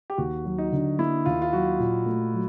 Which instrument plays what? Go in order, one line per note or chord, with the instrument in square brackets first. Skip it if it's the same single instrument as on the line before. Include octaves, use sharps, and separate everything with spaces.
[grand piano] G4
[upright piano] D#2 [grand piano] F#4
[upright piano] F#3
[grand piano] D#4
[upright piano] D3
[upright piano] A#3 [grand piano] E4
[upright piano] D#2 [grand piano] F4
[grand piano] F4
[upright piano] F#3 [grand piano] F#4
[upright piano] A#2
A3
F#3